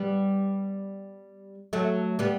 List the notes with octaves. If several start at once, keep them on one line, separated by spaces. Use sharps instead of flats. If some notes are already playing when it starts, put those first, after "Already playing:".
Already playing: G3 B3
F#3 A3
G3 B3